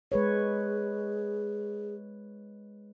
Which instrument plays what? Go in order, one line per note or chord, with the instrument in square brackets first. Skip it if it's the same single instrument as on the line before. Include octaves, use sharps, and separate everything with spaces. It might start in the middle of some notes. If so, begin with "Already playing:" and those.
[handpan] G#3 B4 C#5 [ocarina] G#4